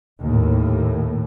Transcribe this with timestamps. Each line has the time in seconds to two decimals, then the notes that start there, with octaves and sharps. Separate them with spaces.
0.20 D#2 A2